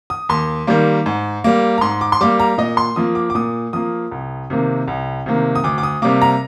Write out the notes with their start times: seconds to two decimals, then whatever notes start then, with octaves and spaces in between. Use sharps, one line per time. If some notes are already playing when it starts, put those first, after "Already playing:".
0.10 D#6
0.29 D#2 C6
0.67 D#3 G3 A#3
1.06 G#2
1.44 G3 A#3
1.78 A#5
1.81 G#2 C6
2.01 D6
2.12 C6
2.21 G3 A#3 D6
2.40 A#5
2.58 A#2 D#5
2.77 C6
2.96 F3 A#3 D#6
3.15 D6
3.30 D6
3.35 A#2 D#6
3.73 F3 A#3 D#6
4.12 C2
4.50 C3 D#3 A#3
4.88 C2
5.26 C3 D#3 A#3
5.55 D#6
5.64 D2 D6
5.78 D6
5.83 D#6
6.02 C3 G3 A#3 D6
6.22 A#5